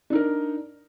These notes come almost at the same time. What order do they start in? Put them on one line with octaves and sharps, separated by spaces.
D4 D#4 A#4